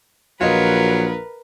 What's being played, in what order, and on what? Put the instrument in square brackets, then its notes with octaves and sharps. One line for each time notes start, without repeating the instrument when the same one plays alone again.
[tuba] A#1 [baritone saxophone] F#3 [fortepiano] F4 D#5 [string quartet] A#4 B4